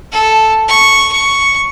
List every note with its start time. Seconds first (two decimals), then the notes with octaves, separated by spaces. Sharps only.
0.12 A4
0.68 C#6
1.12 C#6